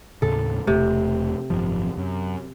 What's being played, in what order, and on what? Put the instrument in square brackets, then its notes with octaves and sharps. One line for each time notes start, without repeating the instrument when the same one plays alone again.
[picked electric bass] D#2 A2 C#3 [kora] A4
[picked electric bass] E1 A3 [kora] C3
[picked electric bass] G#1 F#2 F3
F#2